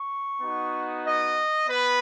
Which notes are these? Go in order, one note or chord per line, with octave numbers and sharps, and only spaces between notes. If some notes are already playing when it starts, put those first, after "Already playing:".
Already playing: C#6
B3 D#4 F#4
D#5
B3 B4